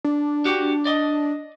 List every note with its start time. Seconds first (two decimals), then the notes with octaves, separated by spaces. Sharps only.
0.05 D4
0.45 F#4 G4
0.85 D5 D#5